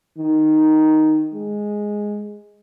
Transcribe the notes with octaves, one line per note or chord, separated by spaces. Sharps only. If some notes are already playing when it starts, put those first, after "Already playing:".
D#3
G#3